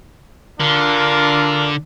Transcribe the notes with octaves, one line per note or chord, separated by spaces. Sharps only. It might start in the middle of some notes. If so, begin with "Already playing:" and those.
D3 D4 F4 A#4